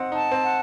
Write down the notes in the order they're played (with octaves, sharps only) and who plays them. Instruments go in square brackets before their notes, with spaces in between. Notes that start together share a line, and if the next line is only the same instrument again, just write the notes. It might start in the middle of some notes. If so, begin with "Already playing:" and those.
Already playing: [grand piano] C4 D#4 [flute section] F#5
[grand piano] D#4 [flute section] A5
[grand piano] C4
[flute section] F#5